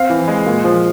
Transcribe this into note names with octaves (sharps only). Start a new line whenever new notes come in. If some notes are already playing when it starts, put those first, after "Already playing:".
Already playing: C4 F5
E3
G#3
A#2
F3